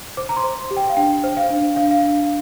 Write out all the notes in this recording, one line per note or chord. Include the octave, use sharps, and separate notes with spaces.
C5 D6
A#5
C6
C5
G4
G5
F5
D4 G5
C5
F5
D4
D4 F5
F5
D4